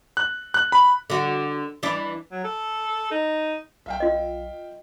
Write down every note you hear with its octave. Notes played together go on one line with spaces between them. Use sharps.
F#6
F#6
B5
D3 F#4
E3 D4
F#3
A4
D#4
B1 E5 F5 G5
F4 D#5